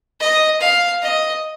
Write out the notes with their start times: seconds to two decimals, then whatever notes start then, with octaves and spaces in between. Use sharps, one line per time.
0.20 D#5
0.61 F5
1.03 D#5